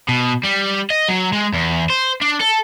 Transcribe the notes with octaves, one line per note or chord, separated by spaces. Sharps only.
B2
G3
D#5
F#3
G#3
E2
C5
D4
A4